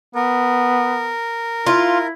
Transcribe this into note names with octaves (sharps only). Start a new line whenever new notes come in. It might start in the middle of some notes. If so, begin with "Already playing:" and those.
B3 A#4
E4 F4